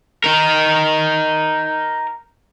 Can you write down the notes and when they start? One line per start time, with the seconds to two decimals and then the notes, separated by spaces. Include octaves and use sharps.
0.24 D#4 A#4